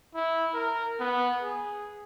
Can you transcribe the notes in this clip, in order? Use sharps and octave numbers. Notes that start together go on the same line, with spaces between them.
E4
A#4
B3
G#4